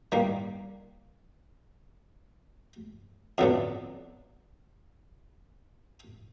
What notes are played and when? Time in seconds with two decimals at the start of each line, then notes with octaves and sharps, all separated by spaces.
0.12 D#3 G3 A#3
3.38 F2 D3 F#3 B3 D4